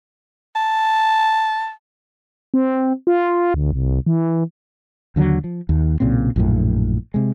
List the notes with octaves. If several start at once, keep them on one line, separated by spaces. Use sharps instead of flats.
A5
C4
F4
D2
C2
E3
D#2 D3 F3 F#3
F3
D#2
B1 A#2 C#3 C4
A#1 F#2 A2
C3 G#3